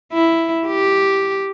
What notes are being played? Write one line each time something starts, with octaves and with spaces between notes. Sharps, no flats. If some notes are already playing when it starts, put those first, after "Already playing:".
E4
G4